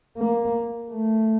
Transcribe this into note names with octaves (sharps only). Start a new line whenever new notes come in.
A#3
A3